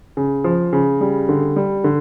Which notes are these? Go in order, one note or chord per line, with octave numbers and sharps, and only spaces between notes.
C#3
F3
C#3
G3
D3
G3
D3